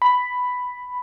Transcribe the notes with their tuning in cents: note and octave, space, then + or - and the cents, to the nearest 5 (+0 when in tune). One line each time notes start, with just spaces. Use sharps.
B5 +5